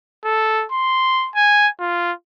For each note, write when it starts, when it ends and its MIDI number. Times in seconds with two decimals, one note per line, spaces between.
0.24 0.65 69
0.72 1.30 84
1.35 1.68 80
1.80 2.12 65